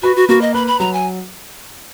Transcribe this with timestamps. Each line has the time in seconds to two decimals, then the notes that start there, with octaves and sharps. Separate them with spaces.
0.03 F#4 B4
0.16 F#4
0.29 A#3 F#4
0.42 D#5
0.54 B4 B5
0.67 B5
0.79 F#3 A#5
0.93 G#5